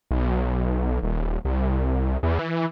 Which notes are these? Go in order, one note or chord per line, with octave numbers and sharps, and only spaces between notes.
B1
D#1
C2
E2
E3